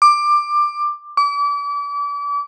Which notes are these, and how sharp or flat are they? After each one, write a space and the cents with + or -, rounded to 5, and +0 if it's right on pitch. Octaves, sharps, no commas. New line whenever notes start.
D6 +15
D6 -35